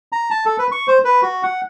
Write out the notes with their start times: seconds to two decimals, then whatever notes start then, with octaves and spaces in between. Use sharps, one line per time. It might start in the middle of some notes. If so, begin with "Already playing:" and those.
0.12 A#5
0.30 A5
0.46 A4
0.59 B4
0.72 C#6
0.87 C5
1.04 B4
1.22 F#4
1.43 F#5